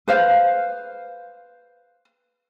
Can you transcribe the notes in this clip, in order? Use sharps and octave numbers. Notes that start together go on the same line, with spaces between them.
B4 C5 F5